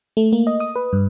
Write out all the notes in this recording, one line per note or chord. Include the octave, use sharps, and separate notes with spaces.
A3
A#3
D#5
D#6
B4
G2